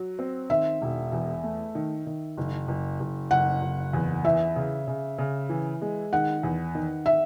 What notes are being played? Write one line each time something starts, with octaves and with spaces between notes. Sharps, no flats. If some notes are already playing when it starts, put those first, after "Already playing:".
Already playing: F#3
C4
D#3 E5
E1
E2
A3
D#3
D#3
F#1
F#1
F#1
F#1 F#5
F#1
E2
E3 E5
C#3
C#3
C#3
E3
G#3
D#3 F#5
E2
D#3
E5